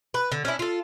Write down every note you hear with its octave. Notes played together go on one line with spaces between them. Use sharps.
B4
D3
C#4 D4 E4
F4 A4